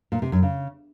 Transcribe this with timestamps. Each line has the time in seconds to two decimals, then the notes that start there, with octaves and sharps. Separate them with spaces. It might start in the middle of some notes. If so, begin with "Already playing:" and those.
0.12 A#2
0.22 C3
0.32 F#2
0.42 C#3